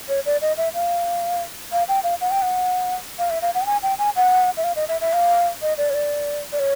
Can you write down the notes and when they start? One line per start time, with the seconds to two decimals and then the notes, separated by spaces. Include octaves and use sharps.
0.09 C#5
0.26 D5
0.41 D#5
0.57 E5
0.74 F5
1.72 F5
1.88 G5
2.04 F5
2.21 F#5
2.31 G5
2.42 F#5
3.19 F5
3.30 E5
3.42 F5
3.55 F#5
3.61 G5
3.66 G#5
3.83 G5
3.99 G#5
4.16 F#5
4.57 E5
4.64 F5
4.76 D#5
4.89 E5
5.01 E5
5.13 F5
5.62 D#5
5.78 D5
5.90 C#5
5.94 D5
6.53 D5
6.59 C#5